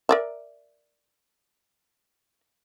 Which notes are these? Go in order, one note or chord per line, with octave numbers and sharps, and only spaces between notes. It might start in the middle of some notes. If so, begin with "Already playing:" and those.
A#4 D5 E5